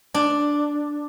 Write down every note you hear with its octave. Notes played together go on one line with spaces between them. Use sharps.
D4